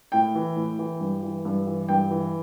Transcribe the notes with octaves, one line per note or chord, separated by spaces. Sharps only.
A2 G5
E3
A2
E3
G2
E3
G2
E3
G2 G5
E3